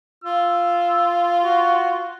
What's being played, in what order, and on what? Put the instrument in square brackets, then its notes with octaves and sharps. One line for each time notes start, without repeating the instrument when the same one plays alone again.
[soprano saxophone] F4 [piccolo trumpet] E6
[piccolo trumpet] F#4